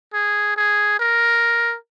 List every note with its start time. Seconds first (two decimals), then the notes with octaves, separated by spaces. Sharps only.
0.14 G#4
0.57 G#4
0.99 A#4